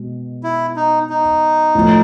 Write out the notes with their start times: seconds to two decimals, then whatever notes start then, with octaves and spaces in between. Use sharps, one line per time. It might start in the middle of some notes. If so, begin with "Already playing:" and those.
Already playing: B2 G#3
0.43 E4
0.76 D#4
1.10 D#4
1.75 A2 F3 A3